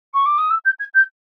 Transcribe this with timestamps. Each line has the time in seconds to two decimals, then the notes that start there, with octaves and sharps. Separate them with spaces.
0.13 C#6
0.25 D6
0.38 D#6
0.50 E6
0.65 G6
0.79 G#6
0.94 G6